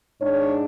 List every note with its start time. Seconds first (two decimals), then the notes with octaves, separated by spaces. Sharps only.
0.20 G#2 G#3 D4 C#5